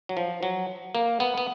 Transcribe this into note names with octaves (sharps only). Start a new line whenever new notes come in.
F#3
F3
F#3
A#3
B3
B3